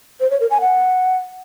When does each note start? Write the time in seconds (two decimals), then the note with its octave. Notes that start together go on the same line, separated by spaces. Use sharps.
0.20 C5
0.31 C#5
0.41 A#4
0.51 G#5
0.61 F#5